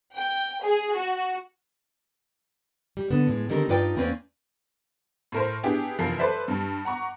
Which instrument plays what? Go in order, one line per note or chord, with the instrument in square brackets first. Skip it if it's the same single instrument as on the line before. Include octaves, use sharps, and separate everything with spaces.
[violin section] G5
G#4
F#4
[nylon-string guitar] G3
D3 B3 D4
A2 G#3
D3 D#3 G3 C4 D#4 A#4
G2 D#4 F4 B4 D5 G5
E2 A#3 C4 C#4 B4 D5
[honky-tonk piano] A2 A#4 C5
B3 D4 E4 G4 G#4
F1 F#2 E3 F3 A#4 C7
A4 B4 C5 D5 E5
G2 G3
F#5 A#5 C#6 D6